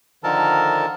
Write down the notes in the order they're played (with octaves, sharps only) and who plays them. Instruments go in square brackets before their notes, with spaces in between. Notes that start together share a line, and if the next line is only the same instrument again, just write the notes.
[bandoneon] D3 D#3 F3 A4 A#4 A5